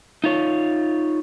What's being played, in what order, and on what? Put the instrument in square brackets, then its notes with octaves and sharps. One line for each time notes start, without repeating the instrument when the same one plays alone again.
[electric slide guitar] D#4 F4 C#5